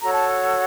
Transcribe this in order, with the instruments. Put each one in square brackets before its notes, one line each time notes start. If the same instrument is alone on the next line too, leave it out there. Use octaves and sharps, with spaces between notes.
[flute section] F#4 A4 C#5 A#5
A5